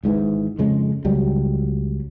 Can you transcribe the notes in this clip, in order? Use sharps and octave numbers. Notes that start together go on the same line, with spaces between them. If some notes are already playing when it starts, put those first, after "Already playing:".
G#1 G#2 D3 E3
F2 C#3 G#3
C#2 F#3 G3